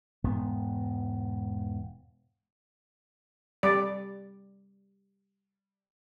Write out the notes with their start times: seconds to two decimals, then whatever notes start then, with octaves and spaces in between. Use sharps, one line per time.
0.24 E1 G#2 B3
3.63 G3 D5